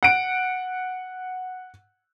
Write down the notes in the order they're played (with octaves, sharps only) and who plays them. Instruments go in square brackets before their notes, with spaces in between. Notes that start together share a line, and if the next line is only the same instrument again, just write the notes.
[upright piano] F#5 D7